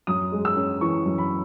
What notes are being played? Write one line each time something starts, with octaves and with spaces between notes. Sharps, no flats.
F#2 D#6
G#3
E6
C#4
E3 C#6
F#2
B5